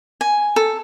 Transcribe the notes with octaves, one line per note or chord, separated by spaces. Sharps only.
G#5
A4